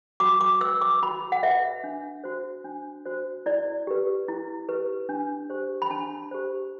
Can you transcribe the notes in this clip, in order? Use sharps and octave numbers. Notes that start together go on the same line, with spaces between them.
F#4 D6
D6
B4 E6
D6
F#4 B5
F#5
B4 E5
D4
F#4 C5
D4
F#4 C5
E4 D5
G4 B4
E4
G4 B4
D4
G4 C5
B5
D4 A5
G4 C5